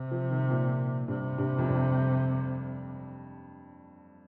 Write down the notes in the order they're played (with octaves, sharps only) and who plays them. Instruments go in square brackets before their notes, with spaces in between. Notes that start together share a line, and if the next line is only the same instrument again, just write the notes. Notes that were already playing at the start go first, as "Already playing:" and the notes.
Already playing: [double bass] C3
[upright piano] F3
D#3
A#2
[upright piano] G2 [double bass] C3
[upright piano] G2
F2
G2